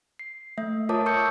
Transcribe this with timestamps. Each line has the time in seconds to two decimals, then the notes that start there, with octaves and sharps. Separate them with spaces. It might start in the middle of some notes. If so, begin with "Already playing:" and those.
0.19 C7
0.58 A3 E5
0.89 F4 A#4 C#5 A5 D6 D#6
1.06 C#6 E6 G6 C#7